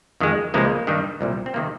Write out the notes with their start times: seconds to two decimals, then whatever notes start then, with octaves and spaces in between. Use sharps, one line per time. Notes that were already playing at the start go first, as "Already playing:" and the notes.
0.20 F2 D#3 G#3
0.54 C#2 C3 F3 G#3 A#3
0.87 G2 D#3 G3
1.21 C2 A#2 G3
1.46 C4
1.54 C3 D#3 A#3